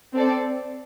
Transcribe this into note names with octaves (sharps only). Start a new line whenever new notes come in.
C4 A4 D5